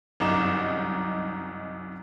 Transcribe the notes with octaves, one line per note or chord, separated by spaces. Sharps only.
G1 C2 F#2 D#4 E7